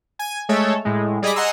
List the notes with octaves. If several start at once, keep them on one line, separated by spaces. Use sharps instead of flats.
G#5
G#3 A3 A4 C#5
A2 G#3
G3 G#4 D#5 B5 D6
D#5 F#5 G#5 A#5 C6 E6